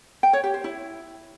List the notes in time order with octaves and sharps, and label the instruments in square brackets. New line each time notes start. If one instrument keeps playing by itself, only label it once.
[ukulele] G5
C#5
G4
C5
E4